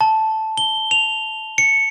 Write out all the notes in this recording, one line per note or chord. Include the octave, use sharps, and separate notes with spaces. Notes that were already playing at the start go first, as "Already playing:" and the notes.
A5
G7
F7
C#7